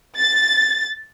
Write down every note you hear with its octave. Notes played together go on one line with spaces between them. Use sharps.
A6